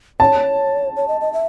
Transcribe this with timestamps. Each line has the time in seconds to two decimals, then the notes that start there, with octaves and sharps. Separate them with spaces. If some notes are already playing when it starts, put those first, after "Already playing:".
0.20 C#5 A5
0.96 C#5
1.08 D#5
1.21 D#5
1.33 E5